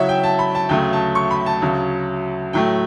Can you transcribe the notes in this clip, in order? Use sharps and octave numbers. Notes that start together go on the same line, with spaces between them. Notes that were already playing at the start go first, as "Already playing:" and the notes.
Already playing: C#3 F#3 C#4 E4 E5 F#5
G5
A5
B5
A5
D2 C#3 F#3 A3 G5
A5
C#6
B5
A5
D2 C#3 F#3
A2 F#3 A3 G5